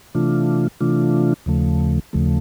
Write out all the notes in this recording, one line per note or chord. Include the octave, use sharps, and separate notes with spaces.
C3 E3 A3 D4 F4
C3 E3 A3 D4 F4
D#2 C#3 F3 A3
D#2 C#3 F3 A3